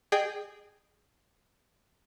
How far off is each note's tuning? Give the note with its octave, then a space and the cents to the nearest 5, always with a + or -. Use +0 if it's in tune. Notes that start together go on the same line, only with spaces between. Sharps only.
G#4 +0 D#5 -40 G5 +0